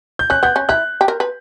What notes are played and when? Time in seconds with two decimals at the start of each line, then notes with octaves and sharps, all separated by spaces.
0.19 G6
0.30 C#4 F#6
0.43 B3 G6
0.56 C#4
0.69 E4 F#6
1.01 G4
1.08 A#4
1.20 B4